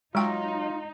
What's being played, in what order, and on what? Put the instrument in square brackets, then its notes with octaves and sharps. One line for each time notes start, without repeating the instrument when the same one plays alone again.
[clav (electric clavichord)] F#3 [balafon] G#3 G5 [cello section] D#4 [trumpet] F4